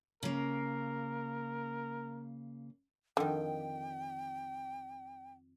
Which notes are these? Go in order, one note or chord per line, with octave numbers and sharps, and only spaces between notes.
C#3 A#3 A#4
F2 D3 D#3 G5